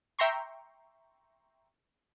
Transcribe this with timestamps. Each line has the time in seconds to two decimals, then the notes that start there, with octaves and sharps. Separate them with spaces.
0.19 E5 G5 A#5 C6 C#6